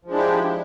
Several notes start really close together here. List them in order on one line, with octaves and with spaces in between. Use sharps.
F3 G#3 D4 E4 G4